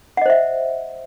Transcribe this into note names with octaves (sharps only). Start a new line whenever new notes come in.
C5 D#5 E5 F#5